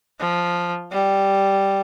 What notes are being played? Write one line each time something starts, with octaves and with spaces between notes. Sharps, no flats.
F3
G3